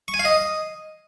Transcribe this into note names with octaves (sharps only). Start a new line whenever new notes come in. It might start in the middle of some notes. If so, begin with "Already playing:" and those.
C#6
G#5
F5
D#5